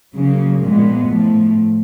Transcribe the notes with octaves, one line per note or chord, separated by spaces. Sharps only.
C#3 F#3 A#3
A#2 F3 G#3 B3
A2 F3 A3